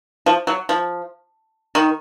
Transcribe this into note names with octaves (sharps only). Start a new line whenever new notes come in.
F3
F#3
F3
D#3